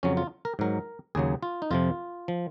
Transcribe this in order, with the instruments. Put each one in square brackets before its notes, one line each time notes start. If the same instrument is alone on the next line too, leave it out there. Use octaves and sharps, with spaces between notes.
[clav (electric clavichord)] F2 C#3 F#3 C#4
F4
A#4
G#2 F#3 A#4
D#2 C#3 F#3 G#4
F4
D#4
F2 C3 F3 F4
F3